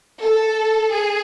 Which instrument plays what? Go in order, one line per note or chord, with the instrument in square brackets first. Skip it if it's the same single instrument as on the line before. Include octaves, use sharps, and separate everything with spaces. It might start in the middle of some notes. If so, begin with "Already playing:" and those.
[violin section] A4
G#4